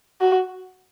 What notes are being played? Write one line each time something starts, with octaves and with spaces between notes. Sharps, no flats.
F#4